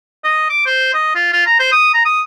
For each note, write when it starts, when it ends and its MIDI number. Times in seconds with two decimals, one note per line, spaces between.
0.24 0.48 75
0.50 0.64 86
0.66 0.91 72
0.94 1.15 75
1.15 1.33 65
1.33 1.46 65
1.46 1.58 82
1.60 1.69 72
1.72 1.91 87
1.94 2.04 82
2.05 2.22 87